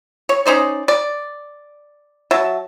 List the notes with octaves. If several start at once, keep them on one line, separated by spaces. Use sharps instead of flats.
C#5
C#4 D#4 C5 D5
D5
F#3 E5 A5